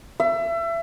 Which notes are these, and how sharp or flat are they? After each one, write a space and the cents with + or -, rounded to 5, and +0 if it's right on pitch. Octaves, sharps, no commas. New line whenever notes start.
E5 +30